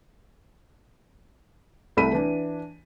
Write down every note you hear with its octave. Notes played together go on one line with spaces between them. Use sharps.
C2 A3 E5 B5 D#7
E3 D4